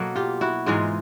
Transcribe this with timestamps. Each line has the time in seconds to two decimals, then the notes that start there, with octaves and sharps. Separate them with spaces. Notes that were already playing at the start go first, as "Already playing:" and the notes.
Already playing: B2 F#3 A#3 A4
0.16 F4 G4
0.41 E4 F#4
0.66 G#2 E3 G#3 D#4 F4